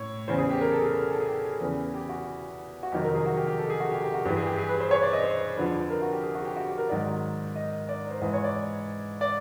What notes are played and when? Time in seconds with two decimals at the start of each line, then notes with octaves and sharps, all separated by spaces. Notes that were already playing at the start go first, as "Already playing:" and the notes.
Already playing: A2 C#5
0.27 E2 C#3 E3 C5
0.38 G#4
0.50 G4
0.61 A#4
0.72 A4
0.84 G#4
1.12 A4
1.20 G#4
1.27 G4
1.60 E2 C#3 E3
1.94 G4
2.09 F#4
2.83 F#4
2.92 F2 C3 D#3 F#3 G4
3.04 A#4
3.15 G#4
3.26 F#4
3.37 G4
3.47 G4
3.59 A4
3.70 G#4
3.80 F#4
3.91 G4
4.02 G4
4.14 F#4
4.25 G2 G4
4.29 E3
4.36 G#4
4.46 G4
4.58 G#4
4.69 B4
4.80 C5
4.91 C#5
5.02 D5
5.13 D#5
5.23 C5
5.56 F2 D3 F3 B4
5.90 A#4
6.02 F#4
6.12 G4
6.23 G#4
6.35 F#4
6.45 G4
6.57 F#4
6.67 G4
6.78 A#4
6.89 G#2 D#3 F#3 D5
7.55 D#5
7.89 D5
8.10 C5
8.21 G#2 E3
8.33 C#5
8.44 D5
9.21 D5